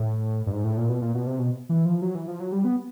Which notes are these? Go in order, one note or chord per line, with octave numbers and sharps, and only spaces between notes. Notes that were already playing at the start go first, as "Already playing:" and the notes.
Already playing: A2
G2
G#2
A2
A#2
B2
A#2
B2
C3
B2
E3
F3
F#3
E3
F3
F#3
G3
B3